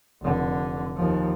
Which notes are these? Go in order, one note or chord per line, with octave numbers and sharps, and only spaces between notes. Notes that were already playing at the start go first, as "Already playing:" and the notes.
F1 D3
D#2 F3